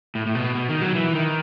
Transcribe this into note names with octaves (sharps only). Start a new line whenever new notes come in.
A2
A2
B2
B2
D#3
F#3
E3
D#3